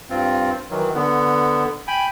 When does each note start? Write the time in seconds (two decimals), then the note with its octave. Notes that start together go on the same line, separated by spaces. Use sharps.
0.10 G2 C4 F4
0.71 D#3 E3 F#3
0.94 D3 B3
1.88 G5 G#5 B5